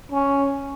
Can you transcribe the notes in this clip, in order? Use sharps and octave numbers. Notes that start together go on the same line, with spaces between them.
C#4